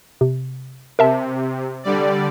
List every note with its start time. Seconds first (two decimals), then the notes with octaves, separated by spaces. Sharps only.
0.21 C3
0.99 C3 A#4 E5 A5
1.83 D3 G3 D5